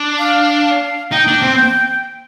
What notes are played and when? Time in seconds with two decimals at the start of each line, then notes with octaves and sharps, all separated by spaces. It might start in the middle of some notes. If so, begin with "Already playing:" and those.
Already playing: D4
0.18 F5
1.12 D#4 G5
1.27 D4
1.42 C4